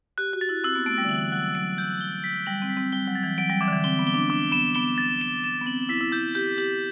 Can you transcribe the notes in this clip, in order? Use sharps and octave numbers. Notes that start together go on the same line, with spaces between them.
G4 F#6
F#4
A6
E4
C4 E6
B3
A3 D7
G3
D3
E3 F#7
F#3 F#6
F#3 D7
G6
G7
B6
G3 F#7
C4
B6
C4
G3 G7
F#3
A6
E3
F#3 D7
G3
E3 D6
D3
E3
C4 G7
B3
G7
D4
D4 D6
B3 E7
B3 G7
A6
E7
E7
B3
C4 F#7
E4 B6
E4
E4 G6
G4 G6
G4 F#7